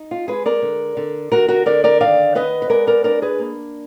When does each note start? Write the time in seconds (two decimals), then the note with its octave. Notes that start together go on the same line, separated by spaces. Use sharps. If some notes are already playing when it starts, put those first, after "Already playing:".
Already playing: D#4
0.11 F4
0.28 G#3 G#4 B4
0.46 A#4 D5
0.62 D3
0.97 D3
1.32 D3 F#4 A#4
1.48 F#4 A#4
1.66 D3 A#4 D5
1.84 A#4 D5
2.01 D#3 D5 F5
2.35 B3 B4 D#5
2.62 B4
2.70 G#3 A#4 D5
2.87 A#4 D5
3.04 D4 A#4 D5
3.22 G#4 B4
3.39 A#3